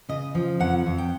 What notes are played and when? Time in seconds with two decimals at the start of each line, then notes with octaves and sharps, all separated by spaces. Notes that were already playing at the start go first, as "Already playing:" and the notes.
0.09 C#3 D#5
0.35 F3
0.60 F2 F#5
0.86 F2
0.98 G5